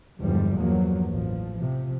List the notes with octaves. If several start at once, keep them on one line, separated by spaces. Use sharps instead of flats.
G1 E2 G#2 F3 G3
E2 G2 F3 F#3 A#3
A1 F3
C3 F3